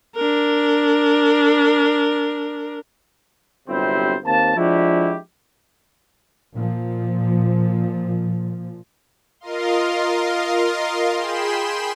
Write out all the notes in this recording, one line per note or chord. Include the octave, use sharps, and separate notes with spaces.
D4 A#4
G1 C3 F#3 C4 E4 C5
D#2 A#3 C4 A5
F3 G#3 D4 E4 F#4 G4
A#2 F3
F4 A#4 D#5 F5 C6
G#4 G5 B5 C6 E7